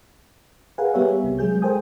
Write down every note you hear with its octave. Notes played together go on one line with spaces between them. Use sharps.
G#4 A#4 B4 F5 F#5 G#5
G3 B3 G4 A#4 C#5 E5
C2 C3
F#3 G#3 G#4 G6
A4 A#4 C5 G5 G#5 D#6